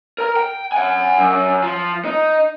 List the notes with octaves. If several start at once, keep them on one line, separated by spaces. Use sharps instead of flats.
A#4 A#5
G5
F#5 G#5
F#2
F3
D#4